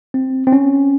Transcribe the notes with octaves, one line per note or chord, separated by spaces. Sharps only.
C4
C4
C#4